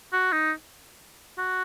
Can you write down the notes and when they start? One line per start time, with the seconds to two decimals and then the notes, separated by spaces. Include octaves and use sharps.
0.12 F#4
0.33 D#4
1.39 F#4